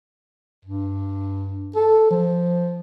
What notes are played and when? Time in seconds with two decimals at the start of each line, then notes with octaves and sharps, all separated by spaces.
0.65 G2
1.76 A4
2.11 F3